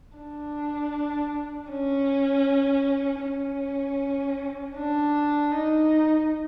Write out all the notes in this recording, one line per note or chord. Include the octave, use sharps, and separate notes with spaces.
D4
C#4
C#4
D4
D#4